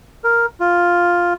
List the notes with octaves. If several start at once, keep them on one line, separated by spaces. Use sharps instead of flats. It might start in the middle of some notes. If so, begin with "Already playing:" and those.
A#4
F4